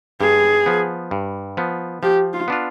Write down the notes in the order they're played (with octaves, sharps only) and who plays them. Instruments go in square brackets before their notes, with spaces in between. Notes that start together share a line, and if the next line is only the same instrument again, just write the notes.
[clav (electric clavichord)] G2 [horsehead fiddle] G#4
[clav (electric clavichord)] F3 B3
G2
F3 B3
[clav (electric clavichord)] F3 [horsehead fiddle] G4
[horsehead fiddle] F4
[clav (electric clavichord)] B3 D4 F4